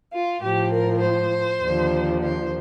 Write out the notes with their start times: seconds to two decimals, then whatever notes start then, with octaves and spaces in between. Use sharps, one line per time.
0.12 F4
0.42 A2 F3 G4
0.71 A#4
1.01 C5
1.62 D#2 D3 F3
2.22 C5